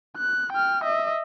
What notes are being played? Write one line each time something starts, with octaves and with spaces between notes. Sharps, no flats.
F#6
G5 F6
D#5 E5